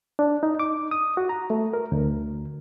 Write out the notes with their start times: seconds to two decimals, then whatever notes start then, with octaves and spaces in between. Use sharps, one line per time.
0.19 D4
0.43 D#4
0.59 D6
0.91 D#6
1.17 F#4
1.29 A#5
1.50 A3
1.73 A#4
1.92 D2